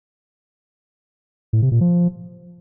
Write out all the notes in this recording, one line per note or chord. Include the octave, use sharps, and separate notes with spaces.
A2
C3
A#2
F3